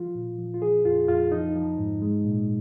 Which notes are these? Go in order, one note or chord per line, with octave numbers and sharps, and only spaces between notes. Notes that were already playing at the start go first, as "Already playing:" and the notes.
Already playing: F3 F4
A#2
F3
F4
F3 G#4
F2 F4
F2 F4
F3 D#4
F3
G#2
G#3
A#2